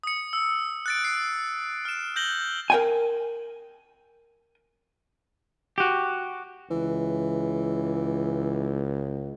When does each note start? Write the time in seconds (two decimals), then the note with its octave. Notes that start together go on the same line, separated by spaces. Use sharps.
0.03 D#6 C#7
0.33 E6
0.86 F#6 A6 D7
1.04 F#6 C7
1.85 F6 E7
2.16 F#6 G6 A#6 F#7 G7
2.70 A#4 G5 G#5
5.78 F#4 G4
6.71 C#2 E3